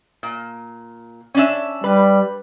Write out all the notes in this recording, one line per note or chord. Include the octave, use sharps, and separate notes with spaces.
A#2
C#4 D4 E5
G3 B4